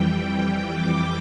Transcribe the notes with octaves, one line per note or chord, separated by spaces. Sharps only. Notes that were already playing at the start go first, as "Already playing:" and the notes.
Already playing: F2 E3 G3 G5
D6